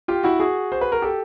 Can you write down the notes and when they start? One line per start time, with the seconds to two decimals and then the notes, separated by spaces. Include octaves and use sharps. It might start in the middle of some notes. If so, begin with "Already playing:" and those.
0.08 F4 G4
0.23 E4 F#4
0.39 F#4 G#4
0.72 C5
0.81 B4
0.92 A#4
1.02 G4 A4